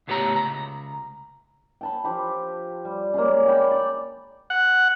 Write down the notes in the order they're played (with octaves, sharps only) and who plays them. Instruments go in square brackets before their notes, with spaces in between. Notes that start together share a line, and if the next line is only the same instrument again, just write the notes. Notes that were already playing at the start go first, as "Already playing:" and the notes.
[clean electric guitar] C#2 A2 B3 G4 C#5 A#5
C#2 A#5
[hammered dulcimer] G5 A5 B5
F3 G4 B5
G3
C#3 G#3 A#3
D5 G5 B5
C#5 D5
[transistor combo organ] F#5